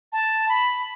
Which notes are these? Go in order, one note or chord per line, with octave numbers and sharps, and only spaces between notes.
A5
B5